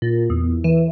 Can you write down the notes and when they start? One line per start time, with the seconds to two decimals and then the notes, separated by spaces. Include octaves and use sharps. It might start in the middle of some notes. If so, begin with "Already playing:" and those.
0.02 A#2
0.30 E2
0.64 E3